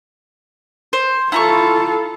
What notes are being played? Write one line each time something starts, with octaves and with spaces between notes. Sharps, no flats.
C5
E4 F4 A4 A#5 C#6